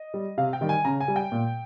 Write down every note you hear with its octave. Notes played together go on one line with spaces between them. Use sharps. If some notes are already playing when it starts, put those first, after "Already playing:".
Already playing: D#5
G3
C3 F5
G5
D#3 G3
G#5
C#3 A#5
G#5
G3
G5
A#2